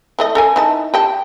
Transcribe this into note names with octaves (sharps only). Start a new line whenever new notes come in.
E3 A3 D#5
A4 A#4 G#5
E3 D#4 A5
G4 G5 A5